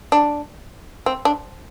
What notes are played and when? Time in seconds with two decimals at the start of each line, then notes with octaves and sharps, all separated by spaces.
0.12 D4
1.06 C4
1.25 D4